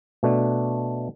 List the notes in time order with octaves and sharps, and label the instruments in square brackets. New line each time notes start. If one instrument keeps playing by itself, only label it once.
[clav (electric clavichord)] B2 A3 D4